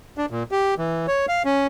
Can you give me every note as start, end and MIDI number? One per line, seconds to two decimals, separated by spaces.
0.18 0.26 62
0.30 0.43 46
0.52 0.74 67
0.78 1.06 52
1.08 1.26 73
1.28 1.43 77
1.45 1.67 61